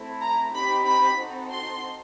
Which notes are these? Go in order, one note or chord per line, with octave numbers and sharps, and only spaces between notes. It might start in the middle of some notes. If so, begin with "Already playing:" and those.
Already playing: A3 C4 E4
A#5
C4 D#4 G4 B5
B5
C4 D#4 F#4 A4
C6